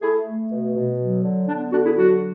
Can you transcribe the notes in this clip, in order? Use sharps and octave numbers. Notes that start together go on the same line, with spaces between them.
A3 E4 G#4
A3
B2
B2
F#3
D3
B3 D4
D3 D4 F#4
E4 G#4
F#3 D4 F#4